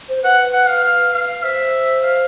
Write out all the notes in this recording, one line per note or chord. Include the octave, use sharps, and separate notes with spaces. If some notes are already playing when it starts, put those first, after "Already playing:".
C5
B4 F#5
F#5
F5
F5
F5
C5 E5
F5